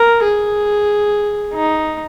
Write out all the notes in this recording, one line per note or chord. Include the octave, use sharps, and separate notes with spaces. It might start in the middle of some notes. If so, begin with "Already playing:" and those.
Already playing: A#4
G#4
D#4